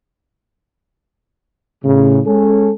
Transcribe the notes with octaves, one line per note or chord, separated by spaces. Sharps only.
A2 C#3
G#3 C#4 A4